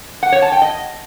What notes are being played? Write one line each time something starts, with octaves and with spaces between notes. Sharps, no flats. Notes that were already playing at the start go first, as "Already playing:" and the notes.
F#5
C#5
A5
G5
D#5